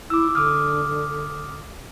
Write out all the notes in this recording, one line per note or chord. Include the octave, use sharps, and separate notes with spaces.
E4 D6 E6
D3 D6 D#6 F6